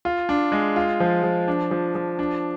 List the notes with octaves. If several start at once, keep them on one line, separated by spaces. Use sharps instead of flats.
F4
D4
G#3
F4
F3
F3
D4
F3
F3
D4